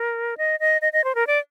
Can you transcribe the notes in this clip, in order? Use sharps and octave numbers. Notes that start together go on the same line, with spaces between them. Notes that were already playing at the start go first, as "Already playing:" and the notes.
Already playing: A#4
D#5
D#5
D#5
D#5
C5
A#4
D5